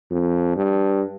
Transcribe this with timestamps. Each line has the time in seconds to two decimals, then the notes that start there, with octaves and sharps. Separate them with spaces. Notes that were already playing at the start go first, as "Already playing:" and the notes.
0.11 F2
0.56 G2